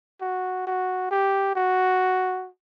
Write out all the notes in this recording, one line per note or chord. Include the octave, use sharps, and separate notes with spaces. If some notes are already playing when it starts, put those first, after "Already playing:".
F#4
F#4
G4
F#4